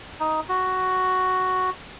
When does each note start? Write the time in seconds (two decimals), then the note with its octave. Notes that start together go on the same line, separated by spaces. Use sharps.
0.20 D#4
0.49 F#4